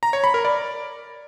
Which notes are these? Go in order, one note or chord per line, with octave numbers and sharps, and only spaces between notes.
A#5
C#5
B5
A#4
D5